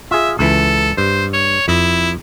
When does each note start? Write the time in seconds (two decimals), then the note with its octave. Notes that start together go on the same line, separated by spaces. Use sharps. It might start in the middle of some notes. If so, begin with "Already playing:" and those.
0.11 F4 G#4 E5
0.39 C#2 E3 A4
0.97 G2 C5
1.33 C#5
1.68 F2 E4